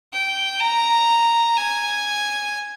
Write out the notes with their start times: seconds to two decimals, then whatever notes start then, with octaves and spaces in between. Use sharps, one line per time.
0.13 G5
0.60 A#5
1.57 G#5